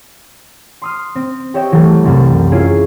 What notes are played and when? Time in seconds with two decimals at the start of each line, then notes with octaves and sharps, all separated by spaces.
0.82 C6 D#6 F6
1.15 C4
1.54 G4 C#5 D#5 E5 G5
1.72 E3 F#3 G3 A3
2.04 C2 F#2 C3
2.51 C#4 E4 F4 G#4 C7